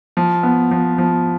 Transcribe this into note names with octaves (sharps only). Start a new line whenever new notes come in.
F3
B3
F3
F3